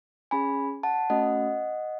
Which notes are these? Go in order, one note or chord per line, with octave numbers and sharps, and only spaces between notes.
C#4 G#4 G#5 B5
F#5 A5
A3 C#4 F#4 D#5 F#5